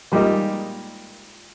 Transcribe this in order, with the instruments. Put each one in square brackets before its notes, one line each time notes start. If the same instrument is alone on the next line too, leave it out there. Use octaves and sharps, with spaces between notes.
[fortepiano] A#2 G3 G#3 A#3 D#4